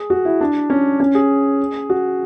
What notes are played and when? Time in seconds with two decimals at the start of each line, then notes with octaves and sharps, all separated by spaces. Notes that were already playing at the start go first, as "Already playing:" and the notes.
Already playing: G#4
0.10 F#4
0.25 E4
0.41 D4
0.70 C#4
1.00 C#4
1.15 G#4
1.90 F#4